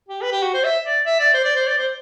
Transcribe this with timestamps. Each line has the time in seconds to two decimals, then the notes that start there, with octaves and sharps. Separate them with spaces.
0.09 G4
0.22 B4
0.32 G4
0.42 F#4
0.54 C5
0.64 E5
0.85 D5
1.06 E5
1.20 D5
1.34 C5
1.44 D5
1.56 C5
1.67 D5
1.78 C5